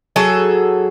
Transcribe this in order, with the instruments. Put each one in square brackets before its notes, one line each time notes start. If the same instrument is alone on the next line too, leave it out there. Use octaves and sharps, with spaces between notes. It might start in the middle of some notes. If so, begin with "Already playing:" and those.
[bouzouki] F#3 G#4 A4